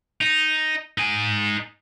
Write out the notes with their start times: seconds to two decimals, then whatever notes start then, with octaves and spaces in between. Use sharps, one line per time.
0.21 D#4
0.98 D#4 G#5